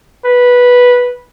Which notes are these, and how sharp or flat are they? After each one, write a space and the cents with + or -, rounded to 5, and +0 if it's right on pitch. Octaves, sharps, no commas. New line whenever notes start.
B4 -10